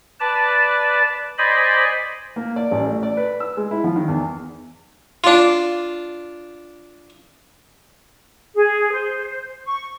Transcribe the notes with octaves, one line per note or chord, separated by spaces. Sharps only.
B4 D5 A5
C5 D5 D#5 G#5 B5
A#3
D5
A1
A3
D5
B4
E6
G#3
E4
F3
D#3
E2
D4 F4
G#4
C5
C#6